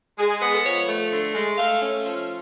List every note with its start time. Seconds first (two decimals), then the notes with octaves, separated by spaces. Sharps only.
0.18 G#3 G#4
0.30 G#4
0.42 B3
0.53 A4
0.65 F3 C#5
0.88 A3
1.12 D3
1.34 G#3
1.58 A3 F5
1.82 C#4
2.05 F3